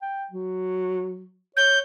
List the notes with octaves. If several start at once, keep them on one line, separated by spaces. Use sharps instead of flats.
G5
F#3
C#5 G6